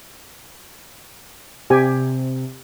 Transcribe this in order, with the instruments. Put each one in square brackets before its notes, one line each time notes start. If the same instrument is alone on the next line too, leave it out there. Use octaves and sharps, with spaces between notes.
[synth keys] C3 [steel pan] G4 G#5